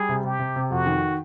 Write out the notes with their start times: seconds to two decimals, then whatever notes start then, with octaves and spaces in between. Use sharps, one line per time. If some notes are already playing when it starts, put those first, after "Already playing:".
Already playing: G3 G#4
0.09 C3
0.23 C3 G4
0.39 C3
0.56 C3
0.71 F2 F#4
0.86 D#3